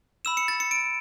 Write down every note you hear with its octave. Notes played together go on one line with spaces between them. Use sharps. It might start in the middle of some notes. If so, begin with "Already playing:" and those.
B5 E6 E7
C#7
A6
C#7
D7